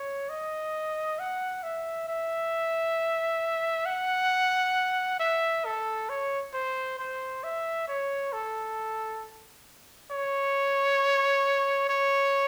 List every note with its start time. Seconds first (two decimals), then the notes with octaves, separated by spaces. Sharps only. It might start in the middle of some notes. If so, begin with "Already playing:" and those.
Already playing: C#5
0.29 D#5
1.19 F#5
1.63 E5
2.08 E5
3.86 F#5
5.20 E5
5.66 A4
6.09 C#5
6.54 C5
6.99 C5
7.44 E5
7.88 C#5
8.33 A4
10.11 C#5
11.89 C#5